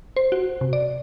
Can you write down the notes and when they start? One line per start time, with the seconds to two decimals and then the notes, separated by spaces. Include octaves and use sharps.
0.16 C5
0.32 F#4
0.61 C3
0.73 D5